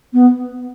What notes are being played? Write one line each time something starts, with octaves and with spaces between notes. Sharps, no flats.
B3